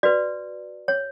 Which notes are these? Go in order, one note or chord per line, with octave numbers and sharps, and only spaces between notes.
F#4 B4 D5
C#5